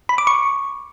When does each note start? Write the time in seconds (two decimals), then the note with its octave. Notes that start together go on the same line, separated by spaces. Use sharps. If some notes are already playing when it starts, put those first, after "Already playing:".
0.09 B5
0.18 D6
0.27 C#6